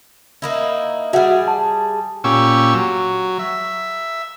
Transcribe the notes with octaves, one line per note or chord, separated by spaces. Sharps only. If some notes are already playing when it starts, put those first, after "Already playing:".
A#3 D#4 E4
G3 F#4 G#4 E5 F#5
A5
A#2 C#4 G4 C#6 E6
F#3
E5